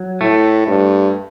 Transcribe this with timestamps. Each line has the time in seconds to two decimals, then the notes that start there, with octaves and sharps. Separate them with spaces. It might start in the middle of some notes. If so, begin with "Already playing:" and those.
Already playing: F#3
0.20 A2 A3
0.67 G2